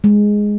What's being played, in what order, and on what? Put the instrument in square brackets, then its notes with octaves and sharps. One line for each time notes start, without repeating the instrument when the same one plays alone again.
[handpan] G#3